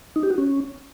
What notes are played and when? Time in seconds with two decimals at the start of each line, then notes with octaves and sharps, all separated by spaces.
0.16 D#4
0.23 G4
0.31 F#4
0.38 C#4